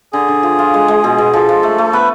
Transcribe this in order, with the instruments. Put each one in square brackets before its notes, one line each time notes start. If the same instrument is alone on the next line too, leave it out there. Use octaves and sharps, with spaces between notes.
[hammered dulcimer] D3 [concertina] G#4
[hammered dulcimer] D3
F3
F4
G#3
G#3
B2
B2
[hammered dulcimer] F3 [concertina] A4
[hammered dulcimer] F3
A3
A3
[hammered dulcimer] B3 [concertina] B4